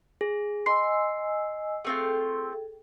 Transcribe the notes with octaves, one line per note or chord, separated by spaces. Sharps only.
G#4
D#5 G#5 C6 E6 C7
A3 C4 F4 G#4 A4 G5